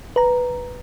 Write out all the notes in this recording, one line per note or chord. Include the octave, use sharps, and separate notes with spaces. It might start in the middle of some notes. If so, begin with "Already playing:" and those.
B4 A#5